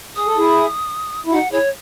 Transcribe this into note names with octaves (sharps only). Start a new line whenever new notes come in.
G#4 D#6
A4
E4 G#4
E4
D#4 F#4 F#5
E4 G#4 C#5